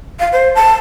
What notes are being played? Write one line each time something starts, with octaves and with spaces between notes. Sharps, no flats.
F5
C5
A5